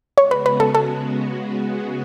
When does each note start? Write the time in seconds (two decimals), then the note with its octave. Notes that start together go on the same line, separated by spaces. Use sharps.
0.17 C#3 G#3 B3 F#4 C#5
0.31 B4
0.46 B4
0.60 A4
0.75 A4